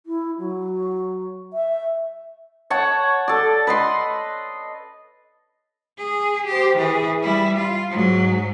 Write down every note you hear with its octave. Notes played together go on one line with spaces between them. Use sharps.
E4
F#3
E5
C#5 F#5 A5
A4 D5
B4 D#5 C6
G#4
G4 C5
E3 G#4
G3 E4
F4
G#2 F#3